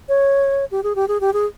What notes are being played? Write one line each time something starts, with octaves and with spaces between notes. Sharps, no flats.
C#5
G4
G#4
G4
G#4
G4
G#4